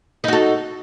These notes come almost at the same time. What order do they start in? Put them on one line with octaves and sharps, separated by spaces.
D#4 F#4 A4